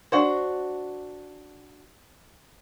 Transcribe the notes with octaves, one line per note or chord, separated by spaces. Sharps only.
D4 F#4 C5